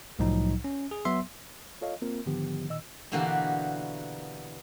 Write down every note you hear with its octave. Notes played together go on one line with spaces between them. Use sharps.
C2 A2 F3 F#3 D#4
C#4
G#4
F#3 B3 E5 C6
F4 A4 C#5 D#5 F5
A#3 C4 F4 A#4
G#2 D3 D#3 F3 B3 G4
A#2 D#3 D#5 E6
B2 D3 E3 A#3 F#4 G4